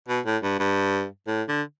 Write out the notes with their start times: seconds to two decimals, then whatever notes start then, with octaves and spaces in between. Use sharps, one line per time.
0.09 B2
0.26 A2
0.43 G2
0.59 G2
1.27 A2
1.49 D3